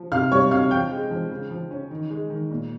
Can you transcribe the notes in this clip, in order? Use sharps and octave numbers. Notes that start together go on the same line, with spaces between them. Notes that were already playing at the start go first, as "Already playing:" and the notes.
Already playing: F3
C3 F5 F6
G3 C#5 C#6
C3 F5 F6
F3 G5 G6
G#3
F3
C#3
F3
C#4
D#3
G#3
D#3
A#2